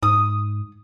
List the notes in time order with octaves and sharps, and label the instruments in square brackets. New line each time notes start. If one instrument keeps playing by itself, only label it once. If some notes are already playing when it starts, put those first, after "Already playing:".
[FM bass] G#2 [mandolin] D#6